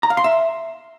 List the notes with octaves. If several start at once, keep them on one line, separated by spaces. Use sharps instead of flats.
A#5
F5
C6
E5